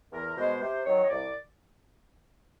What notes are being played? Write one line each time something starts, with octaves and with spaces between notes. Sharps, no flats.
E2 A#4
B2 G#3 C5
C3 C5
D#3 F#3 C#5
D#5
C2 D5